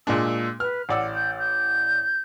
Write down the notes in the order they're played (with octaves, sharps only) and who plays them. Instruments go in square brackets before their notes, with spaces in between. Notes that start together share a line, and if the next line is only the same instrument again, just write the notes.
[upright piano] A#2 G#3 D4 [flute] E6
[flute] B4 [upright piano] F6
[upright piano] A1 D5 E6 [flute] F#5
[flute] G6
G6